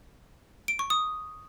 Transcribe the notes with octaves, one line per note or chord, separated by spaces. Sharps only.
D7
C#6
D#6